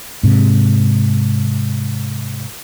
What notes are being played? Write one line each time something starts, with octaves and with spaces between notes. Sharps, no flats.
G#2 C3